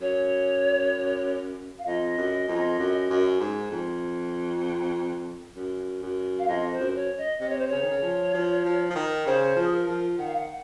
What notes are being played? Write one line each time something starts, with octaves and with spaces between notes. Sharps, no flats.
F#2 C#5
F5
F2 D#5
F#2
F2
F#2
F#2
G#2
F2
F#2
F#2
F5
F2 D#5
C5
F#2
C#5
D#5
C3 D#5
C#5
C5
C#3 C#5
D#3
C#3
F3
F3
F3
F3
D#3
C#3 C5
F3
G#4
A#4
F3
D#3 F#5
F5
F#5